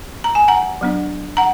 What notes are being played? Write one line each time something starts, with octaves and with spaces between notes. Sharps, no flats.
A#5
G#5
F#5 A#5
F#3 B3 D4
F#5 A#5